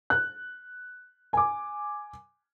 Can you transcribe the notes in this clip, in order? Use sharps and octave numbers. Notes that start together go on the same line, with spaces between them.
F#6
G#5 D6